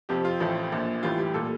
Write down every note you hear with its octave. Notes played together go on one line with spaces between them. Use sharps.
F2 C3 F3 G4
F4
A1 A2 F3 A3
A#1 A#2 F3
A1 A2 E3 G3 F4
G4
A#2 G3 A4